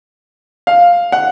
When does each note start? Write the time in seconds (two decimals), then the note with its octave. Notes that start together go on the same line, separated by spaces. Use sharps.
0.67 F5
1.12 F#5